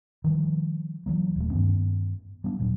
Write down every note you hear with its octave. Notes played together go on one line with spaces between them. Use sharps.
D#3 F3 G3
E3 F#3 A#3
D#1 A3
G2 D#3 B3 C#4
G3 B3 D4
D#1 A#2 F#3